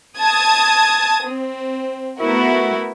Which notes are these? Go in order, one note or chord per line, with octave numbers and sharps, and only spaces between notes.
A5 D#6 G#6
C4
A3 B3 E4 F#4 A#4